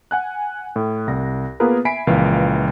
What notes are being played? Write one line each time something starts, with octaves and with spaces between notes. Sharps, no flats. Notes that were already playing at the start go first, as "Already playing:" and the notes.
F#5 G#5 F#6
A2
C2 A#6
A#3 B3 F4 G#4 A#4 B4
E5 G#5 B5 B6 C7 D7
C#2 A#2 E3 F3 F5